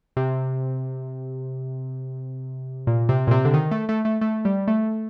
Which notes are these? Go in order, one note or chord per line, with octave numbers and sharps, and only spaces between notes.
C3
A#2
C3
A#2
C3
D3
D#3
A3
A3
A3
A3
G3
A3